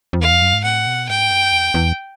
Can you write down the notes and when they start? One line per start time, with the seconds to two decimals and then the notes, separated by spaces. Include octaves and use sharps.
0.13 F2
0.20 E2 F5
0.31 F2
0.42 F#2
0.53 G#2
0.64 A2 F#5
0.87 B2
1.09 G#2 G5
1.31 F#2
1.52 E2
1.74 E2